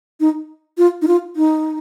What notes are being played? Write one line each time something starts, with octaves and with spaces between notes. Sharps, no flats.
D#4
F4
D#4
F4
D#4